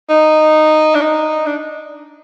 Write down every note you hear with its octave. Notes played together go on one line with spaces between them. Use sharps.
D#4
D4
D#4
D4